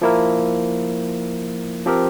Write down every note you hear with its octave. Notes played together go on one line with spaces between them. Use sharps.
F3 A#3 E4 A#4
F3 C4 G4 A#4